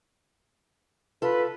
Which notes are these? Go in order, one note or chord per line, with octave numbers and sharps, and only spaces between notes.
F4 A4 B4